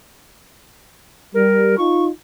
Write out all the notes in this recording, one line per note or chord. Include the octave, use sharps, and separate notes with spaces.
G3 A#4
D#4 F4 C#6